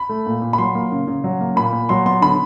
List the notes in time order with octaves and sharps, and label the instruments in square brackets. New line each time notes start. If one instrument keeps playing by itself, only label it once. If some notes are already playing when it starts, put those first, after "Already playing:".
Already playing: [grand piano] B5
A3
A#2
A#2
B5
F#3 C6
A#3
C#3
C#3
F#3
A#3
A#2 B5
A#2
F#3 C6
B3 C6
D3 B5